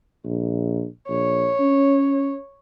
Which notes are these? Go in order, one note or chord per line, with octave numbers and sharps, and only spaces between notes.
A#1
A#1 C#5
C#4